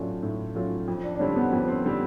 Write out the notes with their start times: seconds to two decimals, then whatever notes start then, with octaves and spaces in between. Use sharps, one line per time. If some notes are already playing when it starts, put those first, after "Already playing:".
Already playing: A2 F#3 A3 C#4 D4 F4
0.23 A2
0.55 F#3 A3 C#4 F4
0.88 F2
1.04 D4
1.15 D4
1.19 D3 G3 C4 C#4
1.36 B3
1.52 F2 B3
1.68 C4
1.85 D3 G3 C4